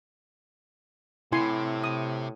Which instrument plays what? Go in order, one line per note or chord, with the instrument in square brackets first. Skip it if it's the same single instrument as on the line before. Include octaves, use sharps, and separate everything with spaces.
[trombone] A2 [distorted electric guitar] C3 [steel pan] E4 G#5 C6
[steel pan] D#6